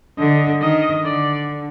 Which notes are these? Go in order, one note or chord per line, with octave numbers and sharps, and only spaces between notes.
D3 D#5
D#3 D#5
D3 D5